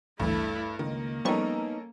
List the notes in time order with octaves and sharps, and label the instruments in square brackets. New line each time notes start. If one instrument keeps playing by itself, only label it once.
[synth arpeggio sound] A1 D2 E3 [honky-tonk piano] G2 [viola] A3 E4
[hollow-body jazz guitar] C#2 [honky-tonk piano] D#3 [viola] A#3
[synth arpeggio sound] F3 G3 C#6 [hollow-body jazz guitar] B3 D#4 [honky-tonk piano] C#4 A4 A#4